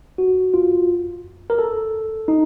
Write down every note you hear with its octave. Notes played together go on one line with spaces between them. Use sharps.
F#4
F4
A#4
A4
D#4